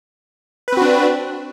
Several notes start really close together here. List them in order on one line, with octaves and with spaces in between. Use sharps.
B4 C4 F#4 D4